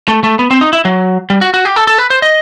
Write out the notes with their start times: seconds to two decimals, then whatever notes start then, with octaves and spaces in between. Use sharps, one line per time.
0.08 A3
0.24 A3
0.39 B3
0.51 C4
0.61 D#4
0.73 E4
0.85 F#3
1.30 G3
1.41 F#4
1.54 F#4
1.65 G4
1.76 A4
1.87 A4
1.98 B4
2.10 C5
2.22 D#5